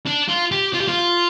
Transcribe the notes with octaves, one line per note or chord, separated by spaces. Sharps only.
D4
F4
G4
F4
G4
F4